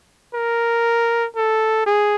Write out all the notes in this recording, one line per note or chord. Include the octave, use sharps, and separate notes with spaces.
A#4
A4
G#4